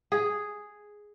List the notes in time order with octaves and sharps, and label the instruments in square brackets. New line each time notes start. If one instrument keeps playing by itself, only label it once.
[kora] G#4